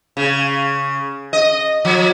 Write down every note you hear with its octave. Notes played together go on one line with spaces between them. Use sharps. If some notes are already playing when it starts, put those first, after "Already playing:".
C#3
D#5
F3